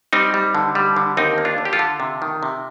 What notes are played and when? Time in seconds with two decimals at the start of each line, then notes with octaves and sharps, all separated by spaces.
0.13 G3 C4 D#4
0.34 G3
0.55 D3
0.75 G3
0.96 D3
1.17 D#2 C4 D#4
1.38 A#3
1.45 D4 F4
1.58 D3
1.65 G4
1.73 F4 A4
1.79 D3
2.00 C3
2.22 D#3
2.43 C3